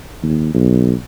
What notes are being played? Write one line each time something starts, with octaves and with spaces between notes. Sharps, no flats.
D#2
B1